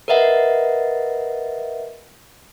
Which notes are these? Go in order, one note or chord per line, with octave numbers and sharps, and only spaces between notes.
A#4 B4 D#5 E5 F#5